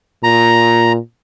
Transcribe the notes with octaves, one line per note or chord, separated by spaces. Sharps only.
A#2 A#5